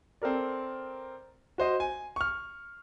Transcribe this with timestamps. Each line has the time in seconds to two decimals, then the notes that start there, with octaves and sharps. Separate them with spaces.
0.22 C4 A4 A#4 D5
1.58 F#4 C5 D#5
1.80 G#5
2.16 C#6 F6